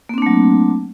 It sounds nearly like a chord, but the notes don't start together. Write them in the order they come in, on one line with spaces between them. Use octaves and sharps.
A#3 C4 D4 A3 F#3